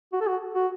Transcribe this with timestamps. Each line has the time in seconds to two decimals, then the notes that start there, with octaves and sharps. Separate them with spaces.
0.13 F#4
0.21 A4
0.28 F#4
0.55 F#4